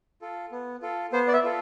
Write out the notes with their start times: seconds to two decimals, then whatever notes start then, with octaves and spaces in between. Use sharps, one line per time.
0.22 F4 A4
0.52 B3
0.82 F4 A4
1.12 B3 C5
1.28 D5
1.33 E5
1.44 F4 A4